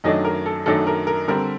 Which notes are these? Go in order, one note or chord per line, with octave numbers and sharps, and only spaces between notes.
F#2 D#3 F#3 A3 D4 D#5
A#4
A4
F#2 D#3 F#3 A3 D4 A4
A#4
A#4
D3 G3 C4 A#4